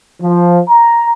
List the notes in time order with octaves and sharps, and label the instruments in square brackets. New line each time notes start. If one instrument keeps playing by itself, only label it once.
[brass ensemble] F3
A#5